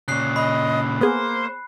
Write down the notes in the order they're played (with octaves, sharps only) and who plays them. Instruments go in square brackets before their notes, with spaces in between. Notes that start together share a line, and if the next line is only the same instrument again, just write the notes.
[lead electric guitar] A#2 C#3 [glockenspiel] F#6 C7
[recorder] D#5 [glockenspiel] B5
[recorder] A#3 [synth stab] B3 G#4 [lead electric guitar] C5